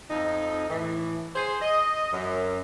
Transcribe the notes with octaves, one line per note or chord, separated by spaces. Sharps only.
F2 D#4
A2 E3
G#4 C5
D#5
F#2